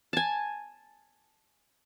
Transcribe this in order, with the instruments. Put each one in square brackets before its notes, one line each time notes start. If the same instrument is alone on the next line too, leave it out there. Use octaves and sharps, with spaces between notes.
[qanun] G#5 A5